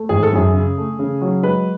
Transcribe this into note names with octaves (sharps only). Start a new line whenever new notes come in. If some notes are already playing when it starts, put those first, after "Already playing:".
Already playing: A3
G#1 G#4
A4
F#2 G#4
C#3
A3
C#3
F#3
G#3 B4